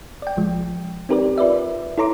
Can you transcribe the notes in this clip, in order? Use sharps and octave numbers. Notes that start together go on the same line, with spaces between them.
D5 G5
A1 F3 G#3
C4 D#4 G4 A#4 B4 D5
F4 B4 D5 E5
E4 A4 C#5 A#5 C6 D6